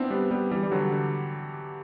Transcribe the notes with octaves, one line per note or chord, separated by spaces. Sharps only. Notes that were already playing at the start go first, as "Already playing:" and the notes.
Already playing: B3 C4 D4 E4
G3 B3
G3 B3
E3 G3
G3
D3 F#3
D3